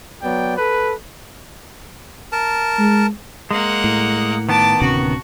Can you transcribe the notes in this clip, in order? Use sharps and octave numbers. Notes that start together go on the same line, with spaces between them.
F#3 B3 D5 G5
A4 B4
A#4 A5
G#3
G#3 A#3 F#5
A2
D#3 B3 A5 D6
D1 C3 C#4 F#4